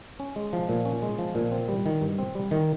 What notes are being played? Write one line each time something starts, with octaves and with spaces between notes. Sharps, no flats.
C#4
G#3
F3
A#2
C#4
G#3
F3
A#2
C4
G3
D#3
G2
C4
G3
D#3